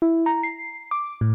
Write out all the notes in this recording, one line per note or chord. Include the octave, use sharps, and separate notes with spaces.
E4
A#5
C7
D6
A2